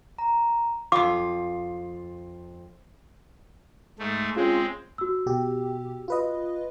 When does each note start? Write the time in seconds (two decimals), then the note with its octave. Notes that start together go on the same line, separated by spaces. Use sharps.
0.19 A#5
0.92 F2 F4 D6
3.99 G#2 A3
4.36 G#3 C4 C#4 F4 G#4
4.98 F#4 E6
5.26 B2 G4
6.08 F4 B4 D#5